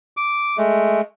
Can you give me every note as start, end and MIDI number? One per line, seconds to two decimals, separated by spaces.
0.17 0.57 86
0.58 1.01 56
0.58 1.01 57